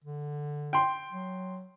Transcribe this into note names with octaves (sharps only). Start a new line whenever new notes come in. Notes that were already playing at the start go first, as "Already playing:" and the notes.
D3
G5 C6
F#3